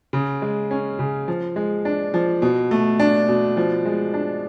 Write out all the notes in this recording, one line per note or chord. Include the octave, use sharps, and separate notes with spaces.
C#3
G#3
C#4
C#3
F3
G#3
D4
F3
B2
A3
D4
B2
F3
G#3
D4